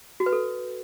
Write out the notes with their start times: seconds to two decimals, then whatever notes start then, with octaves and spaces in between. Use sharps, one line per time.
0.20 F#4
0.26 B4
0.33 A4